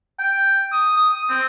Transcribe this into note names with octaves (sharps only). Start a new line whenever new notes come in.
G5
D#6
D#6
C4